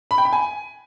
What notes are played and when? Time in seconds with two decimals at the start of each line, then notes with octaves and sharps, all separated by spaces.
0.11 B5
0.18 G5
0.25 B5
0.33 G#5